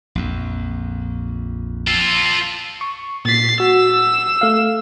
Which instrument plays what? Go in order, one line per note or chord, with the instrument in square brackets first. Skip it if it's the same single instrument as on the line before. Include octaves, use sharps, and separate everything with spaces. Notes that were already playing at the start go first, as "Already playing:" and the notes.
[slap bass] A#1 F2
[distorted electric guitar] F4 A4
[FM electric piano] C#6
[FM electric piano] A#2 B6 [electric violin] A6 C7
[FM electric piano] F#4 [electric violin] E6
[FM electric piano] A3 F5